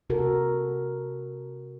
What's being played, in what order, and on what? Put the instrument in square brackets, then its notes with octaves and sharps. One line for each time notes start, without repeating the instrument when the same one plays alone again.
[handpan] C3 F#4 A4 A#4